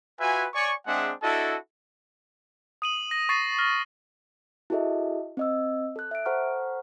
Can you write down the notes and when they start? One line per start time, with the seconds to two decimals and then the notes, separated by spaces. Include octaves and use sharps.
0.20 F4 F#4 B4 E5 G#5
0.54 C#5 D5 G#5 C#6
0.87 G#3 C4 D4 G#4 E5 F#5
1.23 D4 E4 F#4 A4 D#5 A5
2.82 D#6 D#7 F#7
3.11 A#6
3.29 C#6 A6 C7 D#7
3.59 F6 A#6
4.70 E4 F#4 G#4 A4 D#5 E5
5.37 C4 D#5 E6
5.96 A4 F#6
6.11 E5 D7
6.26 A4 C5 F#5 A#5 C#6 F6